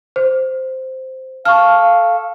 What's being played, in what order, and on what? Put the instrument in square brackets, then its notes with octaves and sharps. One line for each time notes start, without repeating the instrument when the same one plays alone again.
[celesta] C5
[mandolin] A4 [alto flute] F5 [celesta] C#6 F6